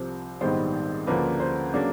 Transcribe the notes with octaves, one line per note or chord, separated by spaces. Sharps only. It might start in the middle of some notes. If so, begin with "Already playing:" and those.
Already playing: C2 C3 F3 C5
A#1 G#2 D#3 G3 B3 C5
D2 C#3 F3 A#3 D4 B4
C5
C#3 F#3 A#3 D4